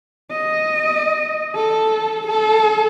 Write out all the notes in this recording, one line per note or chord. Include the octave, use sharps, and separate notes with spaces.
D#5
A4
A4